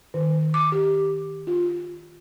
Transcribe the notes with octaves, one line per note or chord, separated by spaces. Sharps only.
D#3
D6
G4
F4